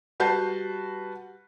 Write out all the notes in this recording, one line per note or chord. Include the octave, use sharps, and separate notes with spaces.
G3 F#4 B4 A5 G6 C7